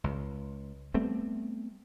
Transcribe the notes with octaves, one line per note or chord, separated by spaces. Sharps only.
C#2
G3 A3 B3 C4